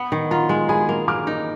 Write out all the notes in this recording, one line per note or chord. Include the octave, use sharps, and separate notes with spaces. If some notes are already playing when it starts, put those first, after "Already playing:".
Already playing: B3 F#5
D#3
F4 F#5 A#5
G#3
G#4 G#5 B5
A#3
A#3 D6 F6
D#4